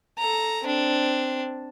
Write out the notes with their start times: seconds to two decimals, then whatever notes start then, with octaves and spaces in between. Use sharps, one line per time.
0.18 A4 A#5
0.64 C4 D4